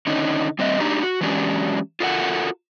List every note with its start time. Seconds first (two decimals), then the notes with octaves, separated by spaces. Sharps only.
0.07 D3 D#3 C#4 D#4
0.59 G3 C4 D#5 E5
0.80 D4 D#4 G4 A#5
1.02 F#4
1.21 E3 F#3 G#3 C#4 D4 G4
2.00 F4 F#4 A4 A#4 F5 F#5